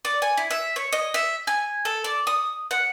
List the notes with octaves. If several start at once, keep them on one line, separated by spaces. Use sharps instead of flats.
D5
G#5
E4
E5
C#5
D#5
E5
G#5
A4
D5
D#6
F#5